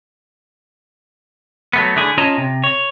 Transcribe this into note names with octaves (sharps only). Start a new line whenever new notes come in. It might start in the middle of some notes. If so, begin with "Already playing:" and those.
F#3 A3 B3
D3 A3 E4 G#4
C#4 F4 C#5 D#5 A5 A#5
C3
C#5